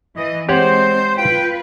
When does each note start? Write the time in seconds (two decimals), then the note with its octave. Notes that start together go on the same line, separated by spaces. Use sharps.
0.16 E3 D#5
0.49 G#3 C4 G4 C5 C#5 F#5
1.17 F4 B4 G5